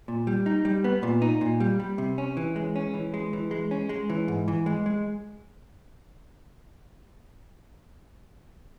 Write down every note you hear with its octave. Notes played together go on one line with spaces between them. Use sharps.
A#2
G3
D#4
G3
B3
A#2
D#4
A#2
G3
G3
C3
C#4
E3
G#3
C#4
E3
G#3
E3
G#3
C#4
G#3
E3
G#2
E3
G#3
G#3